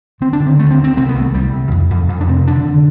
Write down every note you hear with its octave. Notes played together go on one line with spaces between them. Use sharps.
D3 C4
D4
D3
C4
D2 A3
C4
D2
C4
C2 C4
B3
C2
A3
C2 G3
C3
F2
F2
F2
D4
C3 C4
D3 D4
D3